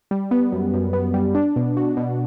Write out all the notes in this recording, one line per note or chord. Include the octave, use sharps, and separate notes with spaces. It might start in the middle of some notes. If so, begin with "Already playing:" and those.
G3
B3
F#2
F#2
B3
G3
D4
B2
F#4
B2